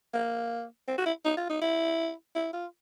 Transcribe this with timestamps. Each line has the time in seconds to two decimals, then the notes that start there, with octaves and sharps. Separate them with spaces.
0.14 A#3
0.88 C4
0.98 F#4
1.06 E4
1.25 D#4
1.37 F4
1.50 D#4
1.61 E4
2.35 E4
2.53 F4